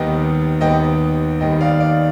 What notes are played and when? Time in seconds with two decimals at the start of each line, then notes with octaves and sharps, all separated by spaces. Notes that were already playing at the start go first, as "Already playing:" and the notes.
Already playing: D#2 D#3 G3 B3 D#5 G5
0.61 D#2 D#3 G3 B3 D#5 G5
1.40 D#2 D#3 G3 B3 D#5 G5
1.61 D5 F5
1.80 D5